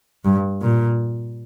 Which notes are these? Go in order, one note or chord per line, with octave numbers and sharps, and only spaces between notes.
G2
A#2